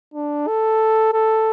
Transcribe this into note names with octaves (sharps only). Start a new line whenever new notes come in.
D4
A4
A4